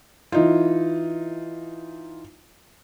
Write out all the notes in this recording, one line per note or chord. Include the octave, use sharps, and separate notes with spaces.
E3 D#4 F4